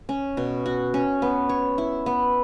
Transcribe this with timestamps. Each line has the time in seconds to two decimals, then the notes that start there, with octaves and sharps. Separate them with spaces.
0.09 C#4
0.37 B2
0.66 F#4
0.94 C#4
1.22 B3
1.49 C#5
1.78 E4
2.06 B3